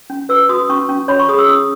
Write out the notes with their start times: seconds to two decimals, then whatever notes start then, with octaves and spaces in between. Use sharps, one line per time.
0.10 C#4
0.29 B4 E6
0.49 F#4 D#6
0.69 C#4 C#6
0.89 C#4
1.08 C#5 B5
1.19 C#6
1.29 G#4 D#6
1.38 E6
1.48 C#4 D#6